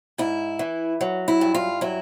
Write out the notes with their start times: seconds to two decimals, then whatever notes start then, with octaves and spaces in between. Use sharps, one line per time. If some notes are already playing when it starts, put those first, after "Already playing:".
0.18 G#2 E4
0.59 E3
1.01 F#3
1.28 E4
1.41 G2
1.55 F4
1.81 F#3 E4